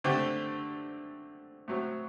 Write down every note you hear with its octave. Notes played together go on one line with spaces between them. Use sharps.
D3 A3 C4 G4
A2 F#3 C4